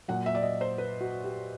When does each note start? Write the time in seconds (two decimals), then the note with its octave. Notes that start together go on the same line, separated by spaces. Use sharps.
0.08 A#2 F#3 F#5
0.26 E5
0.35 D5
0.43 D#5
0.61 C5
0.78 B4
1.01 F#4
1.24 G4